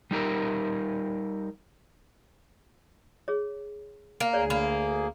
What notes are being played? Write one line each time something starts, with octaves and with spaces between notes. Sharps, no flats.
G3 D#4 G4 A#4
G#4 C#5
A#3
D2 G#4 C#5 D5
A#3 B5